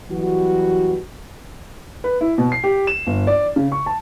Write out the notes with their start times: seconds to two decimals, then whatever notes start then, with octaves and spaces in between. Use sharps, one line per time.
0.11 E3 F#3 G3 B3 F#4
2.04 B4
2.21 E4
2.38 B2
2.52 C7
2.64 G4
2.87 E7
3.07 G1
3.27 D5
3.56 C#3
3.72 C#6
3.86 A5